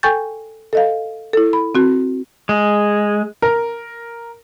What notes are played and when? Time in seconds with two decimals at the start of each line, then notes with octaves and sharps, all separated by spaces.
0.03 A4 G5 G#5 C#6 G6 A6
0.73 A4 D#5 F5
1.33 E4 A4
1.53 B5
1.75 C4 F#4
2.49 G#3
3.42 A#4